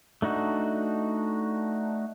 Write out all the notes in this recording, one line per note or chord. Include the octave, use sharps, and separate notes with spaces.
A3 D4 D#4 F#4